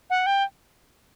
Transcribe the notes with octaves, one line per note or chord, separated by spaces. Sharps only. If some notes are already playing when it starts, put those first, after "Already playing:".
F#5
G5